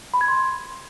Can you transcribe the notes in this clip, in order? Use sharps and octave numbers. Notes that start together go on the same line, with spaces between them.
B5
G#6
C6